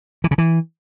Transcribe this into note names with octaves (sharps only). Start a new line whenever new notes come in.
E3
C#3
E3